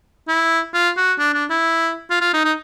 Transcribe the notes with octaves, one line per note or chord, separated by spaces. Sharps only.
E4
F4
F#4
D4
D4
E4
F4
F4
D#4
D#4